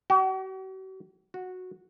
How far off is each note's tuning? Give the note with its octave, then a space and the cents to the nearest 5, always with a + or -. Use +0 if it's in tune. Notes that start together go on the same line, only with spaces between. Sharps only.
F#4 +45
F#4 -10